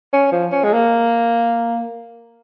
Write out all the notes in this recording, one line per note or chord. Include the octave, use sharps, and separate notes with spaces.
C#4
F3
C#4
G#3
A#3